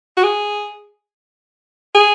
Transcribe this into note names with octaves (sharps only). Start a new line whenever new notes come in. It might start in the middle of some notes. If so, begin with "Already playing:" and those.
F#4
G#4
G#4